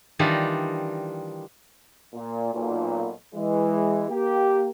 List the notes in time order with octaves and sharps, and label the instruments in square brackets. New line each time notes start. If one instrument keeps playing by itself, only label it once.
[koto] D#3 E3 G3 D4 D#4 F4
[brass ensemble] A#2
B1 A#2
E3 G#3
A#3 G4